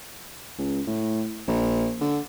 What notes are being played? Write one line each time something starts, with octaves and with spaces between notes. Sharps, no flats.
C#2
A2
A#1
D3